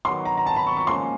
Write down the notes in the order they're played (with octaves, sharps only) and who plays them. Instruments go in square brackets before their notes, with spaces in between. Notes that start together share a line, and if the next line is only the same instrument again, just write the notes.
[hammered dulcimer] D#3 F#3 B3 [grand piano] C6
[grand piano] A#5
A#5
A5
B5
C#6
C#6
[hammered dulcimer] A#2 F3 G#3 C#4 [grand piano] C6